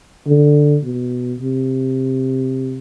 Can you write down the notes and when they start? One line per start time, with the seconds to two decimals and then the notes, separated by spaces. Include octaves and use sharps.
0.28 D3
0.84 B2
1.40 C3